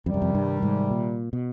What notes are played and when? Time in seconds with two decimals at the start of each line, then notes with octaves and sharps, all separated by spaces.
0.06 F2 C3 D#3 G3
0.14 F#2
0.22 F2
0.35 G2
0.63 G#2
0.91 A#2
1.33 B2